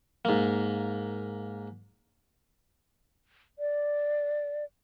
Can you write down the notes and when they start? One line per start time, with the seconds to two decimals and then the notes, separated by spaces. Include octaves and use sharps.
0.25 G#2 A#3
3.59 D5